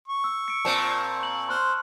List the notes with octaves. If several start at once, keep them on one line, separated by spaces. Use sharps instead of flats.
C#6
E6
C#7 D7
A#2 C4 A5
C#6 F#7
C5 C6 F6 F#6